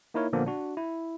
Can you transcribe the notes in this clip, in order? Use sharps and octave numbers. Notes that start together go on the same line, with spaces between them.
A#3 D#4 E4 A#4 C#5
A#2 D3 F3 A#3 B3
D4 F#4
E4